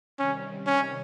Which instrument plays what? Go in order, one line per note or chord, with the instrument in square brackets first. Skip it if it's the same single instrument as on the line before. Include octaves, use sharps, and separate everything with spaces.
[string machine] C3 D#3 G3 [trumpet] C#4
[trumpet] C#4